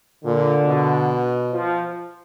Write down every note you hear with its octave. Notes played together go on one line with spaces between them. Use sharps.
A#2 D3
B2
F3